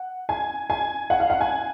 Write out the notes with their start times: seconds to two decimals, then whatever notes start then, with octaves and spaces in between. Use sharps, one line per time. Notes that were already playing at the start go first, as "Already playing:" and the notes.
Already playing: F#5
0.29 G#5
0.70 G#5
1.10 F#5
1.20 F5
1.30 F#5
1.41 G#5